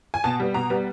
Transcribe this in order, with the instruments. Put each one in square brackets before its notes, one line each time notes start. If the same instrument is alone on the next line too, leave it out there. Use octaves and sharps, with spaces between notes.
[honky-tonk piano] G#5
B2 A5
G3 B3
B2 A#5
G3 B3